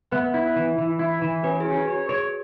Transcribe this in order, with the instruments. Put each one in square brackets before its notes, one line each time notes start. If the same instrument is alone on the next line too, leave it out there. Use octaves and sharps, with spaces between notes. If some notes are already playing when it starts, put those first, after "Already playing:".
[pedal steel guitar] B3 [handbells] B4 E5
[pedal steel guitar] E4
E3
E3
E4
E3
[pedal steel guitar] C#4 [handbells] F#4 B4
[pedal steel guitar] C#4 [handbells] G#4
[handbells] F#4
G#4
[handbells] F#4 [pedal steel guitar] C#5
[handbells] B4
[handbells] G#4 [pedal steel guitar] C#5